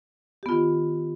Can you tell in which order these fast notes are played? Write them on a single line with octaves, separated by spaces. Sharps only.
G4 B3 F4 D#3